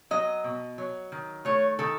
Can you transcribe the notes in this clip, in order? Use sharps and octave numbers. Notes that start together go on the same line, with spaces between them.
F#3 D#5
B2
F#3
D#3
A3 C#5
D#3 A4